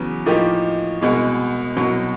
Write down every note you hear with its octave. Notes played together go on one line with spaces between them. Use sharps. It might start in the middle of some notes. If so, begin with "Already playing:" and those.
Already playing: E2 C#3 F#3 B3
A2 F3 A#3 D#4 G4
C2 B2 G#3
C2 B2 F#3